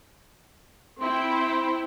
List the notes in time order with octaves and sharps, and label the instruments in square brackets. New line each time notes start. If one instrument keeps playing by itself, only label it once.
[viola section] C4 E4 G5 [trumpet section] C6